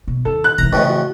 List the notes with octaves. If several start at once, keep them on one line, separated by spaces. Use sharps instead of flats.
B2
D#2 A4
F#6
C3 D#3 E3 G#3 A#5
F2 A2 C#3 E3 B4 D#5
F#4